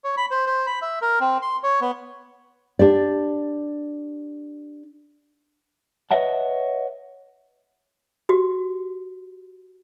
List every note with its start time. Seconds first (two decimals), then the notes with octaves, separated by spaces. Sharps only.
0.04 C#5
0.17 B5
0.31 C5
0.47 C5
0.67 B5
0.82 E5
1.02 A#4
1.20 C4
1.42 C6
1.63 C#5
1.81 B3
2.79 D4 G4 D5
6.11 B4 C#5 D#5 E5 F#5 A5
8.29 F#4 G4